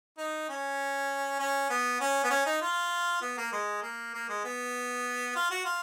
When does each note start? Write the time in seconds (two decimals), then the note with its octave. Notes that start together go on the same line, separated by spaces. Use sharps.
0.18 D#4
0.49 C#4
1.39 C#4
1.70 B3
2.00 C#4
2.24 B3
2.30 C#4
2.46 D#4
2.61 F4
3.22 B3
3.38 A#3
3.52 G#3
3.82 A#3
4.14 A#3
4.29 G#3
4.44 B3
5.36 F4
5.51 F#4
5.65 F4